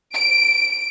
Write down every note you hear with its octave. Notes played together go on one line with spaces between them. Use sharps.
D7